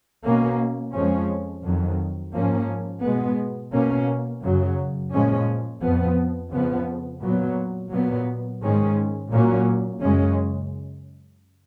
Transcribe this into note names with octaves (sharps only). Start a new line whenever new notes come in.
B2 A#3 C#4
F2 F3 G#3 C#4
F2 D#3 F#3
G#2 F3 A#3 C#4
B2 G#3 B3
B2 A#3 C#4
F#2 C#3 F#3
A#2 F3 G#3 C#4
F2 F3 B3
F2 C#3 F3 B3
A#2 F#3 B3
A#2 F#3 B3
G#2 D#3 G#3 C#4
A#2 F#3 A#3 C#4
F#2 C#3 G#3 C#4